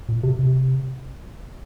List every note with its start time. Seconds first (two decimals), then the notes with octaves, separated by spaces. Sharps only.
0.09 A#2
0.23 C3
0.39 C3